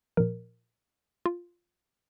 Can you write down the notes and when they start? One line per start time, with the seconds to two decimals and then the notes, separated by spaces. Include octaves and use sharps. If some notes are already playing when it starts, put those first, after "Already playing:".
0.17 A#2 F3 A#4
1.26 F4